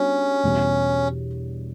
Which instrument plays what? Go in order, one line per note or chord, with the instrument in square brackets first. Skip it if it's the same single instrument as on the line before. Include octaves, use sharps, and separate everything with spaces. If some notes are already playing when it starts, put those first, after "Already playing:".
Already playing: [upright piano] G3 B3 D4 F#4 C#5 [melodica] C#4
[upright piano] E2 B2 G3